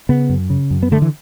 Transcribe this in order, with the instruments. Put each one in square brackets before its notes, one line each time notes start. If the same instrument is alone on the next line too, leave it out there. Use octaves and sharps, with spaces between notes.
[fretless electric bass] C#3 B3
F#2
C#3
F#2
B3
D3 A3
E3